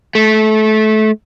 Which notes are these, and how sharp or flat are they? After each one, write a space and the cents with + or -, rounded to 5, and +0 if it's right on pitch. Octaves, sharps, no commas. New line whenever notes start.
A3 -25